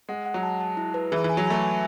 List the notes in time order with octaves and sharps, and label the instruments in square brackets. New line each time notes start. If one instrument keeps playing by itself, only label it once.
[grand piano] G#3 [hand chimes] F#5
[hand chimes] F#5
[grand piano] F#3
[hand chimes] A5
A5
E4
B4
[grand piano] E3 [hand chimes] G#4
[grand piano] E3
[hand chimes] G#5
[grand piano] F#3
[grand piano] A3 [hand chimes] G#5
[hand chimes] G#5